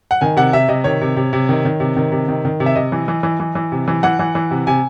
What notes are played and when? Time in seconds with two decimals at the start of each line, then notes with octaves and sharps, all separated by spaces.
0.11 F#5
0.21 D#3 G#5
0.37 C3 F#5
0.53 C3 E5
0.68 C3 D#5
0.84 D#3 C#5
1.01 C3
1.16 C3
1.33 C3
1.49 D#3
1.65 D#3
1.80 C3
1.96 D#3
2.12 C3
2.28 D#3
2.45 D#3
2.60 C3
2.66 E5
2.75 C3 D#5
2.92 E3
3.08 E3
3.23 E3
3.40 E3
3.55 E3
3.72 C3
3.88 E3
4.03 E3 F#5
4.19 E3
4.35 E3
4.51 C3
4.67 C3 G#5